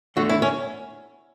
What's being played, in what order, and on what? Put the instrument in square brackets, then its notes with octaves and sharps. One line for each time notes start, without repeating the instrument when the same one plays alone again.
[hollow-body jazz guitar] E2 D3 A3 [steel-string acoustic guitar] F#4
[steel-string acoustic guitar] E4
C#4